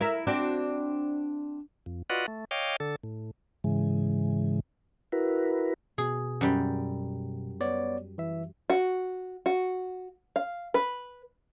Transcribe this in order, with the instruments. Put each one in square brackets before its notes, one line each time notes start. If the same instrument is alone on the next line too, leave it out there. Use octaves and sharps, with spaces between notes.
[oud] E4 A#4 E5
C4 D4 F#4
[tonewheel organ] F2
F4 F#4 B4 D5 D#5 F#5
A3
C#5 D#5 F5 G5 D6
D3 A4
A2
G#2 C#3 E3 G#3
E4 F#4 A#4 B4
[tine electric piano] B2 [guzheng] G#4
[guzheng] F#2 G3
[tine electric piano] B3 C#5 D5
E3 E5
[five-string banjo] F#4
F#4
F5
B4